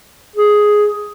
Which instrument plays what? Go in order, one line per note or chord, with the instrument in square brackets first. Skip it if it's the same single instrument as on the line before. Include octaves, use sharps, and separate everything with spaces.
[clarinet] G#4